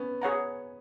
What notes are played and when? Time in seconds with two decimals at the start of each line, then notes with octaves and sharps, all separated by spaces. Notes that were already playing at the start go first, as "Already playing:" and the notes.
Already playing: B3 C#4
0.22 G#4 C#5 F#5 A#5